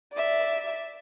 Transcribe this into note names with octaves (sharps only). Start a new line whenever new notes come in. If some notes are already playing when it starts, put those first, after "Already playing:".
D5 E5